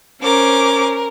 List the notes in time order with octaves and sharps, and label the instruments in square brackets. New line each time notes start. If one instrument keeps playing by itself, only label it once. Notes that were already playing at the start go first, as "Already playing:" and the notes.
[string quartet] C#4 C5 D6 [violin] A#4